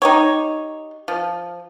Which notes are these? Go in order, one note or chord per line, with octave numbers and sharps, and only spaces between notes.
D#4 G4 C#5
F3